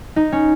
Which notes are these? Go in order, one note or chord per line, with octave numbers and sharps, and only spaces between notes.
D#4
C#4